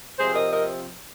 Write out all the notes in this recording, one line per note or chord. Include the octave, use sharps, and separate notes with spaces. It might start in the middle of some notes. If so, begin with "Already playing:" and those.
C3 F3 C4 G#4 C5
A#4 D#5
A#4 D#5